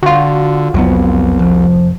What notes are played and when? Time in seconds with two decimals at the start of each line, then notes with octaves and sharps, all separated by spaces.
0.03 D3 F4 F#4
0.74 C2 F2 F#3 B3
1.39 F1 F3